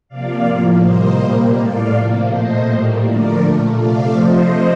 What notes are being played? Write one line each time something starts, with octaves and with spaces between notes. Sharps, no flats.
C3 F3 A#3 D5 F5
A2 F3 A#3
C3 G3 A#3 C5 D#5
A#2 G3 A#3
A2 A3 D5 F5
C3 F3 A#3
A#2 A3 C5 D#5
A2 G3 A#3
D3 F3 A3 A#4 D5
A#2 A3
C3 F3 A3 D5 F5
C3 F3 A3 C5 D#5